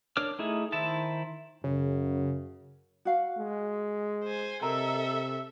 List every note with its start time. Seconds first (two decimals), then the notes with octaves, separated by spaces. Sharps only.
0.17 D4 A#4 C#5 D6 F6
0.39 A3 D#4 E4 G#4
0.72 D#3 E4 C5 E5 A5
1.64 F#2 C#3
3.05 F#4 F5
3.37 G#3
4.24 C5 G#5
4.62 C3 A4 A#4 D#5 E5 A#5